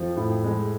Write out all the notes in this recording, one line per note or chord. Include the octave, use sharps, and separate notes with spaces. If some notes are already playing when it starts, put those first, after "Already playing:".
Already playing: F2 F3
A2
G#3